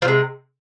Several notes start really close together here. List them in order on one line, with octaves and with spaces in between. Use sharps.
F3 C3 G#3